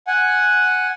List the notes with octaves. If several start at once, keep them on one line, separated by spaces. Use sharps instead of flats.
F#5 G#5